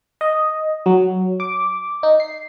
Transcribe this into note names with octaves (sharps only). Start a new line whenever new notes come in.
D#5
F#3
D6
D#4
C7